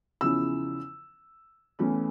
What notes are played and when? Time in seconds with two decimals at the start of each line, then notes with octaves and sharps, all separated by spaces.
0.21 E2 C#3 F3 C#4 E4 E6
1.79 E2 E3 A3 C#4